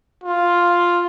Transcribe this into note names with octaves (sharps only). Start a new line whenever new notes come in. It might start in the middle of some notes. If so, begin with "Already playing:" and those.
F4